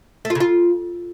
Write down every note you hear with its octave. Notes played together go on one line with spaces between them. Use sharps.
A3
F4
C#3
F4